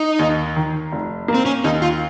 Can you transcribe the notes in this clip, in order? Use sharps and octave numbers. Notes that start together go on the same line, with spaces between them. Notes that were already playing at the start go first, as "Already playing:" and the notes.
Already playing: D#4
D#2
D#3
F1
A#3
C4
C#4
D#2 D#4
F4